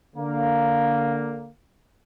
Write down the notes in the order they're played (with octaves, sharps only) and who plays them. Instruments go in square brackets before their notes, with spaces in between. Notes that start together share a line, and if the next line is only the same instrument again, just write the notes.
[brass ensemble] D3 A#3